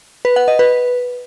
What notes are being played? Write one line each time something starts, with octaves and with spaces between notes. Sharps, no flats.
B4
F#5
D#5
B4